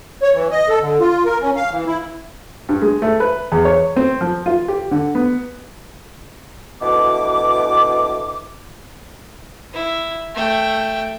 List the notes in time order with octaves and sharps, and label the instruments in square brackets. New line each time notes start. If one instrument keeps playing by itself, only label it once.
[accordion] C#5
E3
D#5
A4
D3
F4
A#4
C#4
F5
E3
E4
[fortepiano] G2
G#3
A3
B4
E2
C#5
C4
F3
F4
G4
D3
B3
[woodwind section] D2 B2 E3 D6
[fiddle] E4
A3 G5